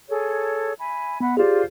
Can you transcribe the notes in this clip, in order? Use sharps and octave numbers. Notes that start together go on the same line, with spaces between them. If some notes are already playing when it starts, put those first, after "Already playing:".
G#4 A4 C#5
E5 G#5 B5
B3 E5 F#5 B5
F4 G4 G#4 C5 D5